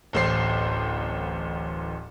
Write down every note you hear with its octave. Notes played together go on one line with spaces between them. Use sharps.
D1 A1 C5 C7